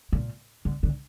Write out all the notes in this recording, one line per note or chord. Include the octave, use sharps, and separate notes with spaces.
A#2
D3
D3